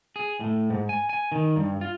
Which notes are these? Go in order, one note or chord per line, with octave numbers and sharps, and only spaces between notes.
G#4
A2
G#2
G#5
G#5
D#3
G2
F4